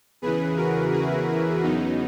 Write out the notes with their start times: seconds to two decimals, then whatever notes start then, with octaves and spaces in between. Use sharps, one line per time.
0.22 E2 C#3 E3 G#4 B4
0.57 F#4 A#4
0.93 E4 G#4
1.63 E2 C#3 F#3 B3 D#4